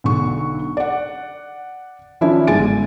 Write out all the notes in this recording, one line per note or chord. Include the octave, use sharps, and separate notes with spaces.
B1 D3 C#6
D5 F#5
D#3 F3 C#4 D4 E4
G1 G#2 G#5 A6 D7